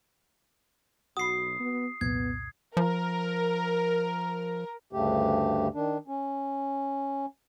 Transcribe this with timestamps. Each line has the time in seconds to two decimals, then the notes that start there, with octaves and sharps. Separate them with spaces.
1.17 B1 F#4 B5 D#6 C7
1.59 B3
2.01 C2 F2 A#2 B3 G#6
2.77 F3 A#4
4.93 D2 G2 C#3 A3 G4
5.74 D#3 D4
6.08 C#4